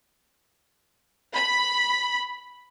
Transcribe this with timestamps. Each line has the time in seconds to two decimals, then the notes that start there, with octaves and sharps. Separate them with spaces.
1.34 B5